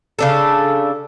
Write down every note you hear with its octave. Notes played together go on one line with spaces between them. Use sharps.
C#3 D4 A4